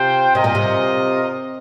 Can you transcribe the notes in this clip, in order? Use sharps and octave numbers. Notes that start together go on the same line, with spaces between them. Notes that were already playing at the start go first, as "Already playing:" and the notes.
Already playing: C3 F4 C5 G5
C3 F4 A#4 D#5
A#2
C3